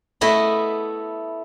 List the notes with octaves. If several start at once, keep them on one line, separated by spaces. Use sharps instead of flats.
A3 B3 E4 D#5 B5